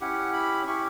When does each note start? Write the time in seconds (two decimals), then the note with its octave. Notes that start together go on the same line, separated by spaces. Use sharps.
0.01 C#4 E4 G4 F#5
0.33 B5
0.66 C#4 E4 G4 C#6